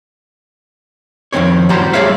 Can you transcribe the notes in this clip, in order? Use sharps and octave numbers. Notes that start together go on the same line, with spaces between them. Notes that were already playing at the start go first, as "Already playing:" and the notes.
F2 G#2 D#3 C4 C#5
F#2 A2 G3 F#4 C5 A#5
G3 A3 G#4 C#5 E5 F5